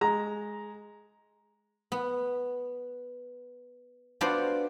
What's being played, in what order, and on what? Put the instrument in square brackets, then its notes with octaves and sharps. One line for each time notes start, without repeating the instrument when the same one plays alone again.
[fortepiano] G#3 A#5
[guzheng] B3
B3 D4 F4 F#4 C5 D5